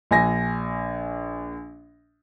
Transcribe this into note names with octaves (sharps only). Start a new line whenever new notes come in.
A#1 G#5 A#6